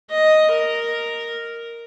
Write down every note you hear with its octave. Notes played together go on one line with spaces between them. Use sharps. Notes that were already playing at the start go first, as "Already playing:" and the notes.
D#5
A#4